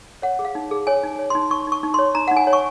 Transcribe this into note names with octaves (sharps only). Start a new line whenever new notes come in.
C#5 F#5
G#4
F5
D#4
G#4
C#5 G#5
D#4
C#5
D#4 C6
D#4 C#6
D#4 C#6
D#4
C#5 C6
D#4 A#5
F#5
D#4
G#5
C#5
C#6